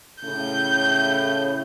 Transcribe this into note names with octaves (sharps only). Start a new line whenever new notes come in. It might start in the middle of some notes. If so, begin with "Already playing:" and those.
A2 C#3 G6